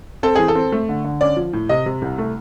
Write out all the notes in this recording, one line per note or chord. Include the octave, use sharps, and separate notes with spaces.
C4 A4
E3 G#4
A4
C4
A3
D3
D3
C#4 D5
F3
A2
C3 D#5
C3
C2
A3